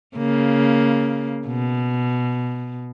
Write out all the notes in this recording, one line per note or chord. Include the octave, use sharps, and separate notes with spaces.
C#3 A#3
B2